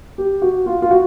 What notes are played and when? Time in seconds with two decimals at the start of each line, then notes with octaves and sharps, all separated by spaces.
0.18 G4
0.42 F#4
0.66 F4
0.82 F4
0.91 F#4